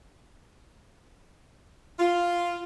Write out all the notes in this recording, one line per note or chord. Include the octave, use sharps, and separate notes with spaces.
F4